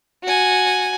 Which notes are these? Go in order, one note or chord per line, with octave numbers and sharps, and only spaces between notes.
F#4 G#5